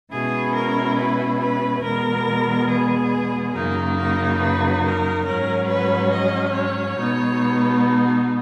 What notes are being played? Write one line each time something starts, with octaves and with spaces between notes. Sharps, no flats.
B2 G#3 C#4 E4 G#4
A#4
B4
B4
E2 B2 G#3 B3 A#4
G#4
F#2 C#3 F#3 A#3 D#4 A#4
A#4
B4
A#4
G#2 F#3 C#4 A#4
B4
D#5
C#5
B2 G#3 B3 D#4